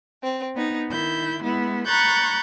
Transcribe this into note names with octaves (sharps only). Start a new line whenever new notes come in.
C4
B3 D#4
D#3 E4 G6
G#3 B3 E4
A#5 B5 C#6 F#6 G6 A6